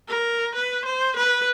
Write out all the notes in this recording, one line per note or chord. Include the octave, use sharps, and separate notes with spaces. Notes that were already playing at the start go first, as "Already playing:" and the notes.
A#4
B4
C5
B4